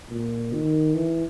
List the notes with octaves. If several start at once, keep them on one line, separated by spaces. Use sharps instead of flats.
A#2
D#3
E3